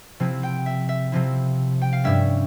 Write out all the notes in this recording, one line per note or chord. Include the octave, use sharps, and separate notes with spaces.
C3 F3 C4 E4
G5
E5
E5
C3 F3 C4 E4
G5
F5
G2 G3 C#4 E5